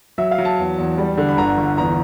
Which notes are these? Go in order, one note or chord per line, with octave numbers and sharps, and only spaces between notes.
F#3 E5
F5
F#3
A5
E2
E2
G3
D3
B5
G1 A#5
G1
E2 A#5